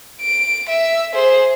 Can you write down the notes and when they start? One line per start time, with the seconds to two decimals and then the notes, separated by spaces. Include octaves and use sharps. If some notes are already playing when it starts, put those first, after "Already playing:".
0.22 D7
0.69 E5
1.14 G#4 C5